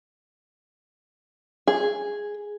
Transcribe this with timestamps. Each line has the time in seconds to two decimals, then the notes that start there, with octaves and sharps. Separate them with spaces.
1.67 G#4